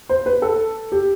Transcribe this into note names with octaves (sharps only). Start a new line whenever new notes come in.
C5
B4
A4
G4